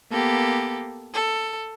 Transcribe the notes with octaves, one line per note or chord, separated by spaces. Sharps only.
A#3 B3 G4 A4
A4